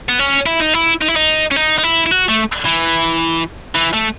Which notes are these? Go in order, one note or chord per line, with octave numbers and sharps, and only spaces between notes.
B3
C#4
E4
D#4
E4
D#4
E4
D#4
C#4
D#4
D#4
E4
E4
F#4
A3
E3
E3
A3